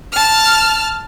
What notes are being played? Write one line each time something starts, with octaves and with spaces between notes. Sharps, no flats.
A5 F6